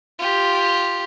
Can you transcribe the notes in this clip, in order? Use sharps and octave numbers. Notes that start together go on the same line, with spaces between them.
F4 G4